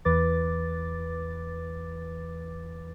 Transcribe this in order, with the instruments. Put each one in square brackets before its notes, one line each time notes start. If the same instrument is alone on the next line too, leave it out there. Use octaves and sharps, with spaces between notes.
[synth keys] E2 E3 B4 D6 A6